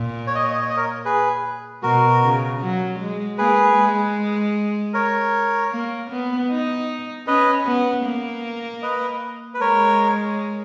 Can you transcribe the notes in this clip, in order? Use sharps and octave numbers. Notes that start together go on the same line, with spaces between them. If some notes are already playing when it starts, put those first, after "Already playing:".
Already playing: A#2
C#5
D#5
C#5
D#5
C#5
D#5
A#4 C#5
G#4 B4
B2 F#4 A#4
C#3
F#3
G#3
A#3 G#4 B4
G#3
A#4 C#5
A#3
B3
D#4
C#4 B4 D#5
B3
A#3
B4 D#5
B4
G#3 A#4 C#5